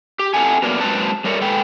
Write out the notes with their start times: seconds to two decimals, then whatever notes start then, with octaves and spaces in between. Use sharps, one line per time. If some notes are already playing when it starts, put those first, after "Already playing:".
0.19 G4
0.34 C4 E4 A4 E5 F#5 G#5
0.62 F#3 A#3 B3 D4 A#4 D5
0.81 F#3 G#3 A#3 C4 B4 A5
1.24 G3 A3 A#4 C#5 D5
1.41 A#2 G#3 A4 B4 G5